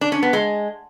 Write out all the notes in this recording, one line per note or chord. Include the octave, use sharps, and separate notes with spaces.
D4
C#4
B3
G#3